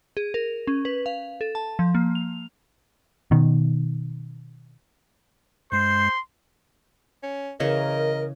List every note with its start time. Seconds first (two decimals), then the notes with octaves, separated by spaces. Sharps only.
0.17 G#4
0.34 A#4
0.67 C#4
0.85 B4
1.06 F5
1.41 A4
1.55 A5
1.79 F3
1.95 A#3
2.15 F7
3.31 B2 D#3
5.72 G2 G#3 C5 C6 C7
7.23 C#4
7.60 C#3 E3 A#4 D#5 C#6